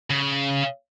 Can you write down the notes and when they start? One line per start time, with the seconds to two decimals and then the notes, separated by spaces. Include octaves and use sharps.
0.11 C#3